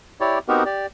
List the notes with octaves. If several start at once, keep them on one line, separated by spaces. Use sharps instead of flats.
E4 G4 C#5 D5
B3 C4 D#4 F#4 G4 A#4
G4 D5